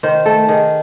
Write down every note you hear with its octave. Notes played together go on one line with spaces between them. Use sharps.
D#3 C5
A3 A4
D#3 G#4